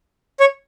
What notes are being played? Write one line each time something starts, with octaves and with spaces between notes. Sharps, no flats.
C#5